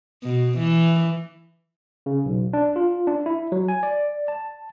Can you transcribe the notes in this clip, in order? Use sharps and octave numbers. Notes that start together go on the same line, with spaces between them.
B2
E3
C#3
B1
D4
F4
D4
E4
F#3
G#5
D5
A5